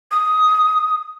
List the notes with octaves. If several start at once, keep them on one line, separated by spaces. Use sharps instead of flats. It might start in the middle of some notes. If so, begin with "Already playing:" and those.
D#6